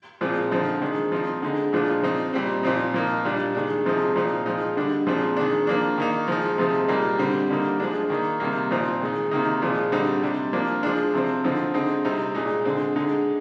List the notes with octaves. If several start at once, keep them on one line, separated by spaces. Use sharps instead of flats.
A#2 F3 G#3 C4
D3 F3 C4 D#4
D#3 G#3 D4
F3 C4 D#4
D3 G#3 D#4
A#2 F3 G#3 D4
F3 C4 D#4
A#2 G3 C4
A#2 F3 C4 D#4
F3 A#3 D#4
A#2 G3 D4
D#3 G#3 D4
C3 F3 G#3 D#4
A#2 F3 C4 D#4
F3 G#3 D#4
D3 G3 D4
A#2 F3 G#3 C4
D#3 G#3 D4
F3 A#3 D4
D#3 A#3 D#4
F3 G#3 D#4
C3 F3 G#3 D#4
A#2 G3 A#3 D#4
D3 G3 C4
D3 G3 A#3 D#4
F3 G#3 D4
D#3 A#3 D#4
C3 D#3 G3 A#3
A#2 F3 C4 D#4
D#3 G#3 D#4
C3 D#3 A#3 D#4
A#2 F3 G#3
D3 G3 C4 D#4
C3 G3 D4
F3 A#3 D4
F3 G#3 D4
C3 F3 C4
D3 F3 C4 D#4
D3 G#3 C4 D#4
C3 G3 C4 D#4
A#2 G#3 D#4
D3 G#3 C4
D3 G#3 D#4